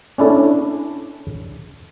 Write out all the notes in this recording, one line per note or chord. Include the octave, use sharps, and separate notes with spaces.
C#4 D4 E4 A4